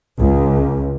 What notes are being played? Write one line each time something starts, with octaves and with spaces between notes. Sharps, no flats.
C#2